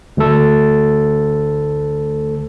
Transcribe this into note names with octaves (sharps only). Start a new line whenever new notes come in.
D2 A3 A4